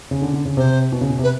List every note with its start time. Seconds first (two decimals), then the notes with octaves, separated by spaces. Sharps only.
0.11 C#3
0.22 D3
0.33 D3
0.45 C#3
0.57 C3 C5
0.92 B2
1.01 C#3
1.10 B2
1.19 C3
1.23 B4